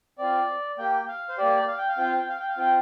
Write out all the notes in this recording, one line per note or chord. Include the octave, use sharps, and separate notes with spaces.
C4 F4 D5
A#3 G4 G5
F5
C5
A#3 G4 D5
F5
G5
F5
C4 F4 G5
F5
G5
F5
G5
F5
C4 F4 G5